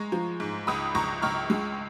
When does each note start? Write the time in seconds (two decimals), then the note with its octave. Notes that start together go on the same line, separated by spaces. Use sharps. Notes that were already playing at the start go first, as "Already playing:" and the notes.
Already playing: G#3 A#5 C#6
0.12 F3
0.40 G#2
0.67 C#2 B5 D#6
0.95 C#2 A#5 C#6
1.22 C#2 C#6 F6
1.50 G#3